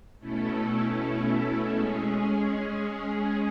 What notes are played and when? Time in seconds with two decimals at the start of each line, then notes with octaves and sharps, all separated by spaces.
0.19 B2 A3 C#4 E4 A4
1.73 G#3 C#4 G#4